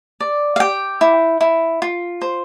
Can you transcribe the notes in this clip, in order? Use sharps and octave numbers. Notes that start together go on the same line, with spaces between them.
D5
F5
G4 G5
E4
E4
F4
C5